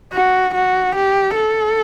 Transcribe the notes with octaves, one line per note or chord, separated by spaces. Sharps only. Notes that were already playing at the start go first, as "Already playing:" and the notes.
F#4
F#4
G4
A4